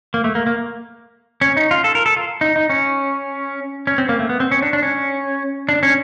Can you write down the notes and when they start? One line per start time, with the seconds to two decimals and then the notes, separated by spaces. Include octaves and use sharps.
0.14 A#3
0.24 A3
0.35 A#3
0.47 A#3
1.41 C#4
1.57 D#4
1.71 F4
1.84 A4
1.95 A#4
2.06 A4
2.16 F4
2.41 D#4
2.56 D#4
2.70 C#4
3.87 C#4
3.98 C4
4.09 A#3
4.19 A3
4.29 B3
4.40 C4
4.51 C#4
4.62 D4
4.73 D4
4.83 C#4
5.69 D4
5.83 C#4